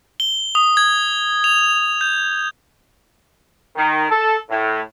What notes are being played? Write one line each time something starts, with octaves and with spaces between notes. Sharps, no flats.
G7
D#6
G#6
F7
G6
D#3
A4
A2